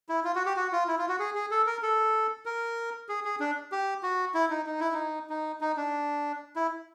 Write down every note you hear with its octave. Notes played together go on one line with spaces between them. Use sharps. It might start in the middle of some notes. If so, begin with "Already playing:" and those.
E4
F4
F#4
G4
F#4
F4
E4
F4
F#4
G#4
G#4
A4
A#4
A4
A#4
G#4
G#4
D4
G4
F#4
E4
D#4
D#4
E4
D#4
D#4
D#4
D4
E4